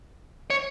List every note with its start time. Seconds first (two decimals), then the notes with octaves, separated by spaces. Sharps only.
0.50 C#5